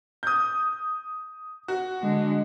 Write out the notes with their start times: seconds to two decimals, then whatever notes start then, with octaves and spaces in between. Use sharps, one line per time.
0.23 D#6 G6
1.68 F#4
2.02 D3 G#3